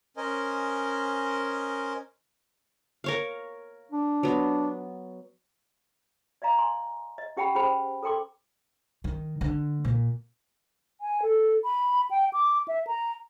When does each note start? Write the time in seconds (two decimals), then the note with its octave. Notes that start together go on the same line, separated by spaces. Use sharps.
0.17 C#4 A#4 C5 D#5 G#5
3.04 A#4 C#5 F5
3.92 D4
4.23 F#3 B3
6.42 D5 D#5 F5 A#5
6.59 G#5 C6
7.18 D#5
7.37 C#4 G4 F#5 G5 A5 B5
7.55 C#4 G#4 C5 G5 B5
8.03 A4 A#4 G5 C6 D6
9.04 D#3
9.41 D3
9.85 A#2
11.01 G#5
11.22 A4
11.64 B5
12.11 G5
12.33 D6
12.68 E5
12.87 A#5